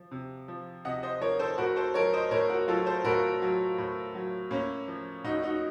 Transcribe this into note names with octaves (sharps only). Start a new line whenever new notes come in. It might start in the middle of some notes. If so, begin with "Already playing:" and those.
Already playing: F3
C3
F3
C3 D#5 F#5
C5 D#5
F3 A#4 C#5
A4 C5
A2 F#4 A#4
A4 C5
F#3 A#4 C#5
C5 D#5
A2 A#4 C#5
F#4 A#4
F#3 F4 A4
A4 C5
A2 F#4 A#4
F#3
A2
F#3
A2 A#3 C#4
F3
A2 D#4 F#4
D#4 F#4